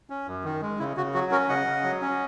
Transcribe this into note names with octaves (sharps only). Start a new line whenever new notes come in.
C#4
F#2
D#3
G#3
C#3 E4
C#3 F#4
F#3 F#4
C#4 F#4 A#4
C#3 D#5 F#5
C#3
F#3
C#4